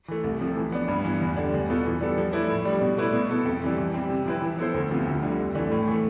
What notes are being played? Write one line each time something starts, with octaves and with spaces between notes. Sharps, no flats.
E3 A3
C2
C3 F3 A3
E3
B3 D4
G2
E3 B3
E2
D3 G3 D4
E2
B2 B3 F4 A4
E3
G3 B3 D4 A4
F3
A3 E4 B4 D5
A2
G3 D4
B2
A3 E4 B4 D5
B2
B3 E4 A4
F2
C3 E3 G3
E3
G3 C4
C3
F3 C4 E4 B4
E3
B3 E4 A4 C5
D2
C3 F3 B3 F4
D2
D3 G3
F2
E3 A3 D4
A2
E3 A3